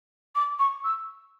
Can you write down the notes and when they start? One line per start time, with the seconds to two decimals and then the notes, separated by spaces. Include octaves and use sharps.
0.35 D6
0.59 C#6
0.84 E6